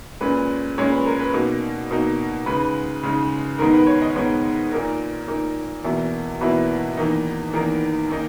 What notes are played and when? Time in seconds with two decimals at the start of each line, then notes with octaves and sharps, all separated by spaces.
0.21 A#2 G#3 C#4 B4
0.78 A#2 G#3 C#4 C#5
0.92 B4
1.06 A#4
1.19 B4
1.33 B2 A#3 D#4
1.91 B2 A#3 D#4
2.46 C#3 G#3 D#4 B4
3.03 C#3 G#3 D#4
3.59 G#2 D#3 G#3 B3 D#4 A#4
3.73 B4
3.87 C#5
4.02 D#5
4.15 G#2 D#3 G#3 B3 D#4 C#5
4.72 A#2 A#3 D#4 A#4
5.28 A#2 A#3 D#4
5.84 E2 B2 A#3 E4
6.41 E2 B2 A#3 E4 B4
6.97 E2 D#3 A#3 D#4
7.54 E2 D#3 A#3 D#4 A#4
8.10 D#3 A#3 D#4